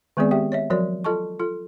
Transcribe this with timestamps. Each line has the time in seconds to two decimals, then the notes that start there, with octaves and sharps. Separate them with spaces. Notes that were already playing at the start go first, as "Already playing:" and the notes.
0.17 D#3 G#3 B3 C4 G#4 D5
0.31 G4 E5 G5
0.52 C#5 D#5 E5
0.70 F3 F#3 F#4 A#4 C#5 D5
1.04 F4 A4 D#5 A5 C#6
1.39 F4 A4